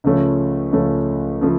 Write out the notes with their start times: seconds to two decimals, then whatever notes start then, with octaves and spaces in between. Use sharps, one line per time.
0.04 C#2 C#3 F3 A3 C#4
0.72 C#2 C#3 F3 A3 C#4
1.41 C#3 F3 A3